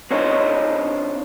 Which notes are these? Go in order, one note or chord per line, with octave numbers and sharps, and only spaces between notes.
C4 D4 D#4 F4 C#5